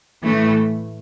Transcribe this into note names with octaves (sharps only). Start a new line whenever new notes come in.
A2 E3 A3